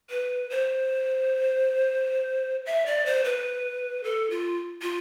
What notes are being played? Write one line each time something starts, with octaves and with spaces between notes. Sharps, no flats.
B4
C5
E5
D5
C5
B4
A4
F4
F4